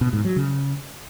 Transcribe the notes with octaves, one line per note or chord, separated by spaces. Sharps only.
B2
G#2
F#3
C#3